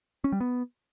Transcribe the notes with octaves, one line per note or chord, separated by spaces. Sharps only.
C#4
G3
B3